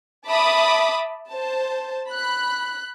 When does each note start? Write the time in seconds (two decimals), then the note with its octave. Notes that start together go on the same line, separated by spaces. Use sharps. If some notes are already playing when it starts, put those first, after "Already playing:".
0.27 E5 A5 B5 D6 D#6
1.30 C5 A5
2.09 B5 F#6